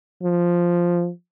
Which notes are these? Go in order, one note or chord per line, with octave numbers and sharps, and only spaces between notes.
F3